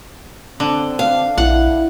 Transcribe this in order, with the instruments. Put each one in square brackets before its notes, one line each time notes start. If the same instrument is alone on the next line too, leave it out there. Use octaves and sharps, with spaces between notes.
[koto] D3 [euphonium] C4
[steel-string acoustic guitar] F5
[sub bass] A#1 [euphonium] E4 [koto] F#5